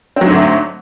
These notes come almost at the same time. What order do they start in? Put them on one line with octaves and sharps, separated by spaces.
C4 F#3 G#2 D3 A3